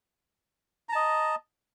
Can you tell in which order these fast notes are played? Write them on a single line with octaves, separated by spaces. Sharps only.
A#5 A5 D#5